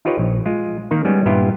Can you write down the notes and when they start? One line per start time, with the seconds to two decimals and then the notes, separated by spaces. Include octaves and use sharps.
0.05 D#4 F4 G4 B4 C#5 D#5
0.18 A#1
0.46 G#3 F4
0.91 D#3 A#3 D#4
1.05 G3 G#3 B3 C#4
1.26 G2 A#2 B3 E4 F4 G4